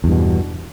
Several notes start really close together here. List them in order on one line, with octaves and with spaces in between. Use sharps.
E2 G2 B2